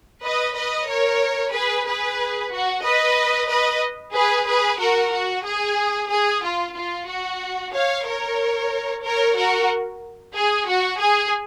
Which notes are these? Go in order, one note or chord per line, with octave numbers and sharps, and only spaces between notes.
B4 D#5
B4 D#5
A#4 C#5
G#4 B4
G#4 B4
F#4
B4 D#5
B4 D#5
G#4 B4
G#4 B4
F#4 A#4
F#4
G#4
G#4
F4
F4
F#4
C#5 F5
A#4 C#5
A#4 C#5
F#4 A#4
G#4
F#4
G#4